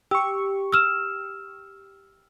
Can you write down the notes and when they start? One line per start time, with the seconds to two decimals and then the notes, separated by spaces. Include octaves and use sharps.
0.11 G4 C#6 E6
0.72 E6 F6 E7